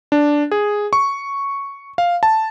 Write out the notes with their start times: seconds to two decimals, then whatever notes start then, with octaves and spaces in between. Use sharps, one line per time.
0.12 D4
0.51 G#4
0.93 C#6
1.98 F5
2.23 A5